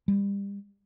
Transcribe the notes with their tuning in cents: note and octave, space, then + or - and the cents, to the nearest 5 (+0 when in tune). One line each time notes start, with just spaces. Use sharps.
G3 +30